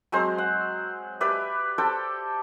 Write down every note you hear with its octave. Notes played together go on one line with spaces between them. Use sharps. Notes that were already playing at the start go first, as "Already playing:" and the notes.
F#3 G#3 C4 C5
F#5
G4 B4 D5 E5
G4 A4 C5 G5